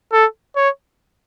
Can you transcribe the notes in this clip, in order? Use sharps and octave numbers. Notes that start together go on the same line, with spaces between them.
A4
C#5